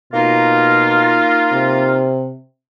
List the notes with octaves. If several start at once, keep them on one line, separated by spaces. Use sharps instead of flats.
B2 A#3 D#4 F4
C3